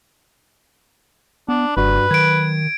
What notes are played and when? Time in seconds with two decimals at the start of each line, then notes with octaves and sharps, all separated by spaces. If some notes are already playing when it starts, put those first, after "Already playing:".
1.49 B3 D4
1.77 F#1 G2 F#4 B4 D5
2.11 D#3 F#3 G#6 D7